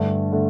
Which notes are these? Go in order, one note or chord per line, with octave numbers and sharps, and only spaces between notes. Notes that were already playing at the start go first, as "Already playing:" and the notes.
Already playing: G2 D3 A3
D3 A3